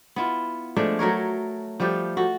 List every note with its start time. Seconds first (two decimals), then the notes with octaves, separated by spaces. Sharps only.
0.16 B3 E4 F4
0.76 F3 G#3 A3 D4
0.99 F#3 A3 A#4 C#5
1.80 F3 G3 A3 G4
2.17 F#4 A4